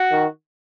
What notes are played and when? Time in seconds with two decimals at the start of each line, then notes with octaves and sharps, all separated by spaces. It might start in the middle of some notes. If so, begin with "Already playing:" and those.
Already playing: F#4
0.10 D#3